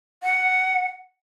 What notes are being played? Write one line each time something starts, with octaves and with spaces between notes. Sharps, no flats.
F#5